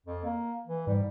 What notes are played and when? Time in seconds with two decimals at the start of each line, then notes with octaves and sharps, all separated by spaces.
0.06 F2
0.24 A#3
0.67 E3
0.87 G#2 G3